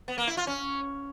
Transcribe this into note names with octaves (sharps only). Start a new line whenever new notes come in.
B3
A#3
E4
F4
C#4